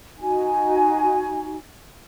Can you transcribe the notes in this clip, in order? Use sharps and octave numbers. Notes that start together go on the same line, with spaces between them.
D#4 F#4 G#5